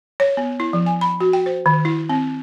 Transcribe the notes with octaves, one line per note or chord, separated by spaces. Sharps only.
C#5
B3
E4
F3
G#5
B5
F#4
G5
C5
D#3
E4
C4